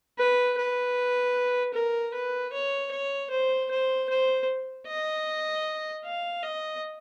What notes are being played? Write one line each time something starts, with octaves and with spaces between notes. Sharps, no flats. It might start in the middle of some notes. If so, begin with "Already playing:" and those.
B4
B4
A#4
B4
C#5
C#5
C5
C5
C5
D#5
F5
D#5